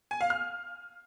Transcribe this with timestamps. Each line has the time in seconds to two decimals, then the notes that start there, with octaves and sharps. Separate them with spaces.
0.11 G#5
0.21 F5
0.30 F6